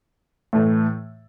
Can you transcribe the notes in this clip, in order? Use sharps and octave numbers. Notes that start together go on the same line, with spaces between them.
A2 E3 A3